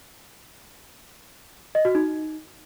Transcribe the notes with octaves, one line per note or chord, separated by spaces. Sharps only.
D#5
F#4
D#4